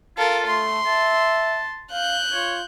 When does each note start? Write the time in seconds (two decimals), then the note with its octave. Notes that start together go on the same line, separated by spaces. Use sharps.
0.18 F4 A4 A#4 F5
0.46 A3 C6
0.87 E5 A5
1.92 F5 F#6 G6
2.33 F4 C#5